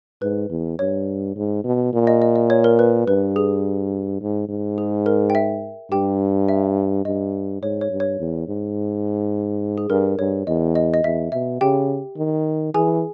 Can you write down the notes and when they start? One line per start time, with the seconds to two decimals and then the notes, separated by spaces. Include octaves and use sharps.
0.22 G#2 B4
0.50 E2
0.79 G2 C#5
1.36 G#2
1.64 B2
1.93 A#2
2.07 D#5
2.22 D#5
2.36 D#5
2.50 C#5
2.64 A#4
2.79 B4
3.07 G2 B4
3.36 G#4
4.21 G#2
4.49 G#2
4.78 G#4
5.06 A#4
5.30 G5
5.35 E5
5.91 G2 G4 G5
6.48 E5
7.05 G2 D#5
7.62 G#2 C#5
7.81 C#5
7.90 G2
8.00 C#5
8.19 E2
8.48 G#2
9.78 G#4
9.90 G2 A#4
10.18 G2 C#5
10.47 E2 D#5
10.75 D#5
10.94 D#5
11.04 E2 E5
11.32 B2 E5
11.61 C#3 G4 G5
12.17 D#3
12.74 E3 G#4 G#5